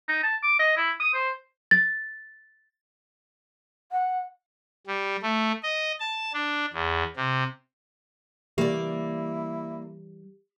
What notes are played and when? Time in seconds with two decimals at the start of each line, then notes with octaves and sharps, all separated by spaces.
0.08 D#4
0.23 A5
0.43 D6
0.59 D#5
0.77 E4
1.00 D#6
1.14 C5
1.71 A6
3.92 F#5
4.87 G3
5.23 A3
5.63 D#5
6.00 A5
6.34 D4
6.73 E2
7.16 C3
8.58 E3 G3 A#3 E4 G4 D5